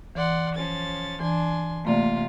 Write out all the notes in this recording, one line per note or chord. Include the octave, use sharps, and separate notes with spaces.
E3 D5 F#5 C6
F3 C#4 A6
E3 D4 G#5 C6
C3 A3 A#3 F4 D5